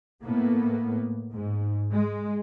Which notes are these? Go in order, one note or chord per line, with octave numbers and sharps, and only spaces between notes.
A2 A#3 B3
G#2
G#3